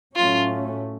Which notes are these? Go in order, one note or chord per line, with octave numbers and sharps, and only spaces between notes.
A2 F#3 A3 C#4 F4